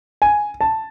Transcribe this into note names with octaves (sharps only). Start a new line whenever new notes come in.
G#5
A5